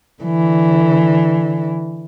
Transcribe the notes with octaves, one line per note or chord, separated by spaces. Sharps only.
D3 E3